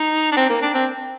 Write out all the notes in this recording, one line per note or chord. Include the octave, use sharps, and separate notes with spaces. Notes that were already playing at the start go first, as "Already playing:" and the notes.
Already playing: D#4
D4
C4
A#3
D4
C4